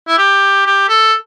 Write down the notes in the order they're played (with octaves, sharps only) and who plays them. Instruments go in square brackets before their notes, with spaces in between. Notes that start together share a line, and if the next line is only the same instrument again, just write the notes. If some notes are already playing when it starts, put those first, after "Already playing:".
[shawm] E4
G4
G4
A4